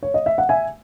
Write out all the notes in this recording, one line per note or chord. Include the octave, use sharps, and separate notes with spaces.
C#5
D#5
E5
F#5
E5 G#5